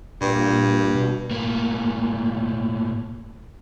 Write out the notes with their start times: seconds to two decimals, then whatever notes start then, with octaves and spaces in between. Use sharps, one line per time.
0.21 G2 A#2
0.95 B2
1.31 A2 A#3